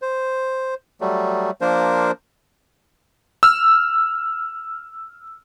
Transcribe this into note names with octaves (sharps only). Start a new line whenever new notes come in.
C5
F#3 G3 A3
F3 A#3 D4 A#4 C5
E6 F6